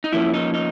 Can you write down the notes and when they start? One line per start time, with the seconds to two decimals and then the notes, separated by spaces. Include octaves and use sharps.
0.04 D#4
0.13 F3 A#3 C#4 E4
0.34 D#4
0.54 D#4